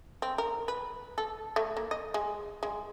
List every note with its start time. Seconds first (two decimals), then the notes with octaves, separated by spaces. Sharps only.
0.22 C4
0.38 A#4
0.68 B4
1.18 A4
1.56 A3
1.77 A#3
1.91 D#5
2.14 G#3
2.63 G#3